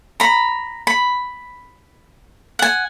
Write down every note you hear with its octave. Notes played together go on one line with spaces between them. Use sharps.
A#5 B5
B5
F#5 G#5